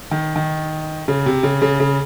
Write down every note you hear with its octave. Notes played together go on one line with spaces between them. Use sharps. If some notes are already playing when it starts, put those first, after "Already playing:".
D#3
D#3
C#3
C3
C#3
C#3
C#3